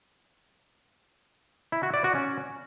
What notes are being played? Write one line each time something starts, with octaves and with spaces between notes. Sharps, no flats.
E4
F#4
D5
F#4
C#4